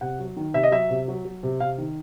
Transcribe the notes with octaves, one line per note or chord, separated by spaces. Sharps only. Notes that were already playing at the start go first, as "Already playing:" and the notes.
C3 F#5
F#3
D#3
C3 E5
D#5
F#3 E5
C3
F#3
F#3
C3
C3 F5
D#3